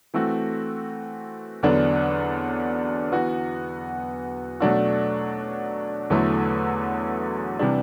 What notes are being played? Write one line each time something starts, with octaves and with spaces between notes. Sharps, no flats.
E3 A3 C4 F#4
E2 D3 F#3 B3 D4
E3 B3 F#4
B2 F#3 A3 D4 F#4
E2 D3 F#3 A3 E4
C3 E3 G3 D4